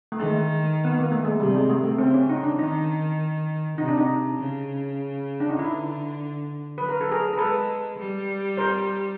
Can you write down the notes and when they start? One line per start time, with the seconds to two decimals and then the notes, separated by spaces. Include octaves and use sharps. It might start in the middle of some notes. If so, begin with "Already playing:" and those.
0.12 A3
0.19 D#3 G#3
0.85 B3
0.99 A#3
1.12 A3
1.25 G#3
1.40 C3 G3
1.54 G#3
1.70 A3
1.84 A3
1.98 C#3 C4
2.14 C#4
2.30 D#4
2.44 D4
2.59 D#3 D#4
3.78 C3 D#4
3.88 D4
3.98 D#4
4.39 C#3
5.40 D4
5.49 D#4
5.58 D3 E4
6.78 F#3 B4
6.89 A#4
7.01 A4
7.11 G#4 A#4
7.33 A#4
7.37 G#3 A4 B4
7.98 G3
8.57 A#4 C5